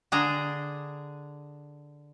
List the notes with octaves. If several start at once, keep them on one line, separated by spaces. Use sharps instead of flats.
D3 D4 G#4 A#5